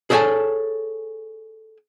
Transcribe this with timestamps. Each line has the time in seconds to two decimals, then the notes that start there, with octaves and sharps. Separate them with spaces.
0.10 G#4 A4 C#5 D#5 G#5 A5